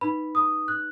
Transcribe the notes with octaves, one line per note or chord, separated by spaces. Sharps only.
D#4 B4 B5
D#6
F#6